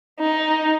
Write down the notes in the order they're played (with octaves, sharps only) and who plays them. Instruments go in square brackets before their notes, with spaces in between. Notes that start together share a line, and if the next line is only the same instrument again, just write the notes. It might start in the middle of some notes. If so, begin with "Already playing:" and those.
[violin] D#4